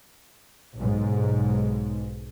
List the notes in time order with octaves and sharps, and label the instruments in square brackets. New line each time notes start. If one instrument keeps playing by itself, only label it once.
[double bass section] B1 G#2